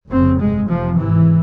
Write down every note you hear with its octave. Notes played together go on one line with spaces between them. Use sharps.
F1 F2 C#3 C4
G1 F2 C3 G#3
F1 F2 C3 F3
G#1 G#2 E3